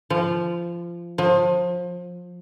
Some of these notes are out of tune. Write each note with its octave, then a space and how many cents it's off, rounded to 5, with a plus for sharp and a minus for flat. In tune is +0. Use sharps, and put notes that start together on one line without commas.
F3 -20
F3 +25